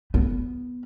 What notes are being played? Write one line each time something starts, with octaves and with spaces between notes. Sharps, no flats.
B3